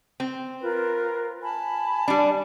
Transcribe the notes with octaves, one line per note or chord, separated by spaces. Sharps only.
C4
F4 A#4 B4
G#5 A5 B5
G3 D4